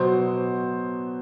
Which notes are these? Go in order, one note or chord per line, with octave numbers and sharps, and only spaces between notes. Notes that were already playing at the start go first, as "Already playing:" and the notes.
Already playing: B2 F#3 B3 C5